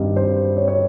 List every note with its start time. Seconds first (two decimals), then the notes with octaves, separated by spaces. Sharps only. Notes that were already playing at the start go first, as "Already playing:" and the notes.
Already playing: G2 D#3 G3 C4 D#4 D#5
0.16 C5
0.57 C#5
0.68 C#5